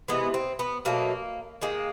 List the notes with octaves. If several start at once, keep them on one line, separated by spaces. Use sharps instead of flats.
C3 E3 G#3 B3
C4
B3
B2 F#3 A3 A#3
D#3 G#3 A#3